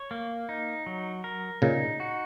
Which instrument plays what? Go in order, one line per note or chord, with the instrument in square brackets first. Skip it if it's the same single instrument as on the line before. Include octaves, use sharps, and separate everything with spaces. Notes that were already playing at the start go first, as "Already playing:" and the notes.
Already playing: [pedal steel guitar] C#5
A#3
D#4
F#3
A#4
[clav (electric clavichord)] A#2 C#3 [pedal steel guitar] D#4
[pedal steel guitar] F#4